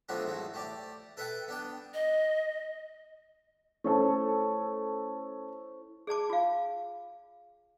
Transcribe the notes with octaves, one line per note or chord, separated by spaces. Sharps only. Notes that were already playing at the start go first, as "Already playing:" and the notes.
F3 F#3 A3 B3 C4 D4
G#2 E3 F#3 A3
A3 G4 D5
A4 B4 E5 F#5 G5 A5
B3 D4 G5
D#5
A3 C#4 E4 A4 C5 C#6
G#4 D5 A5 D6
F4 F5